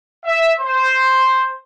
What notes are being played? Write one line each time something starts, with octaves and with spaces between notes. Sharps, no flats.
E5
C5